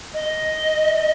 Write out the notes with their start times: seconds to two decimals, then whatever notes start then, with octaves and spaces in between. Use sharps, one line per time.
0.13 D#5